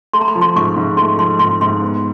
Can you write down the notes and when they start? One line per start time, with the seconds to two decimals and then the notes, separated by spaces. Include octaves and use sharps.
0.13 A3 C6
0.21 A#5
0.28 B5
0.35 F3
0.41 C6
0.56 G#2 C#6
0.76 G#2
0.97 A3 C6
1.19 F3 C6
1.39 G#2 C6
1.61 G#2 C6
1.82 B3